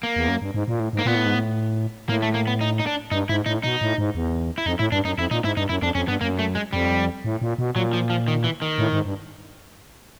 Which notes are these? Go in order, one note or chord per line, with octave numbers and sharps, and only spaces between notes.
A#3
E2
F#2
G2
G#2
A#2
A2
G#2
A#3
A#2 B3
A2
G#2
A2
A2 A#3
A3
A#3
B3
D#4
D#4
D4
G2 D#4
G#2 E4
A2 D#4
B2 D#4
A2
G#2
E2
E4
F2 D#4
A2 E4
G2 D4
F#2 D#4
F2 E4
A#2 D#4
G#2 E4
G2 D#4
F#2 E4
F2 D4
F2 C#4
G2 B3
F#2 A#3
A3
G#3
F2 G3
A2
A#2
B2
A#2 F#3
F3
F3
D#3
E3
D#3
A2
G#2
G2